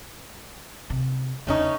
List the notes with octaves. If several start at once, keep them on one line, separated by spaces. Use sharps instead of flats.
C3
E2 C#3 A3 C#4 D#4